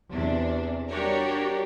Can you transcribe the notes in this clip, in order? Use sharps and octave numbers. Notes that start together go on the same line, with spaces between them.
E2 C3 D4
G3 D4 F#4 G4 A#4 C#5